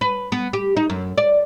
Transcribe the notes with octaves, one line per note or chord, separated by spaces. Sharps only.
B4
B3
G4
D#4
F#2
D5